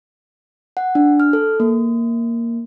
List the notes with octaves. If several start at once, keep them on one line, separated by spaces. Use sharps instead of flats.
F#5
D4
F6
A4
A#3